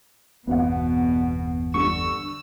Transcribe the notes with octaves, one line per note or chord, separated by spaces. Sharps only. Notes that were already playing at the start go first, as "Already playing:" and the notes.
G1 E2 B2 B3 C4 F#4 F#5
D3 G3 D4 C#6 E6